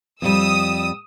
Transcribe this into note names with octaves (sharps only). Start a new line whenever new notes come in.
F2 G3 D#6 E6